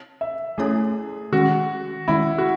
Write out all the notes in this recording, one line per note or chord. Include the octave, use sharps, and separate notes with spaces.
E5
A3 C#4 E4 G#4 A4 C#5
D#3 G#3 C#4 F#4
D#3 G#3 C#4 E4
F#4